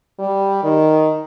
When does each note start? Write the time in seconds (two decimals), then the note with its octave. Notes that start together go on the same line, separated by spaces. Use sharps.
0.19 G3
0.63 D#3